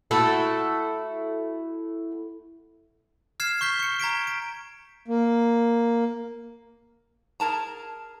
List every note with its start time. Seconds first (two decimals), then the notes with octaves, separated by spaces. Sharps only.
0.11 A3 E4 F#4 A4
3.40 F6 G#6 C7 E7
3.61 C#6 G6 B6 G7
3.79 C#6 C#7
4.00 A#5 G#6 B6 D7
4.27 D7
5.08 A#3
7.40 G#4 A#4 A5 A#5